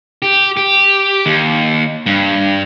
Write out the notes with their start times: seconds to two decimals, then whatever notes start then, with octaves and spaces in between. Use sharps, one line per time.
0.22 G4
0.57 G4
1.26 D#2
2.06 G2